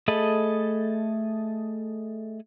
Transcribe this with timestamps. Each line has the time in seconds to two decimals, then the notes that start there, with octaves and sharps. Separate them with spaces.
0.08 A3 G#4 A4 D#5 B5